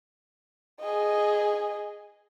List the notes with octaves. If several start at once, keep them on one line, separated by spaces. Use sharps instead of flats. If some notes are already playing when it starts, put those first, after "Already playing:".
G#4 D#5